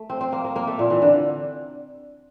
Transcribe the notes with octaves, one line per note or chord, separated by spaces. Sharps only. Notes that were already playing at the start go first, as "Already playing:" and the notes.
Already playing: A3
C4
C4
A#3
A#3
A#3
A3
A#2
E3
D3